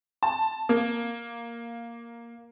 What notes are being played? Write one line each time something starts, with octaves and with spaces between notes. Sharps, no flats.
A5
A#3